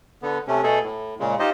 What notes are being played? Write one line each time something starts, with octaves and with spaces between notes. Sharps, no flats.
D3 B3
C3 A3 C#4
B2 A3 G#4 A4
A2
A#2 C#3 G#3
D#4 F4 G4 C5 D#5